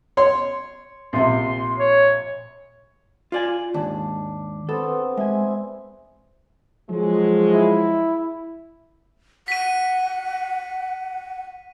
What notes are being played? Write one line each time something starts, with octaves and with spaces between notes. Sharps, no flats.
C#5 C6
A#1 C3 C6
C#5
F4 D5 G#5
D#2 G#2 D4
B3 C4 A4
G#3 E5 G#5
F3 F#3 G#3
E4
F#5 B6 D#7